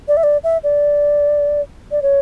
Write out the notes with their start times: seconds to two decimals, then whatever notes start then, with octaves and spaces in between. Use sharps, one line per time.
0.08 D5
0.17 E5
0.23 D5
0.44 E5
0.64 D5
1.91 D5
2.02 C#5